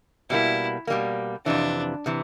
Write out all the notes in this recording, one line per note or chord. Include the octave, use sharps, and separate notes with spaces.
B2 G3 A#3 E4
B2 G3 A#3
F2 C3 E3 D4
C3 E3